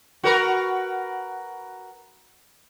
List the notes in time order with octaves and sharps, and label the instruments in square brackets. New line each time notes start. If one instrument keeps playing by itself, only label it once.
[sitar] F#4 A#4 B4